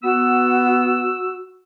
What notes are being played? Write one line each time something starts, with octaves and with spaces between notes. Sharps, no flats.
B3 F#4 E6